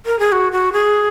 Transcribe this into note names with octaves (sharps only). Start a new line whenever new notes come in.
A#4
G#4
F#4
F#4
G#4